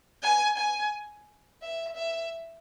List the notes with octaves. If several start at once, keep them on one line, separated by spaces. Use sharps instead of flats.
G#5
G#5
E5
E5